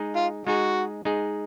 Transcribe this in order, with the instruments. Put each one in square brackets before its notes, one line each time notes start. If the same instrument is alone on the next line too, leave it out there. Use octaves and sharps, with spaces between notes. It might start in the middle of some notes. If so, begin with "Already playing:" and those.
Already playing: [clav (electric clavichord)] G#3 D#4 G#4
[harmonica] F4
[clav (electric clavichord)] G#3 D#4 G#4 [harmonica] F#4
[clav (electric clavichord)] G#3 D#4 G#4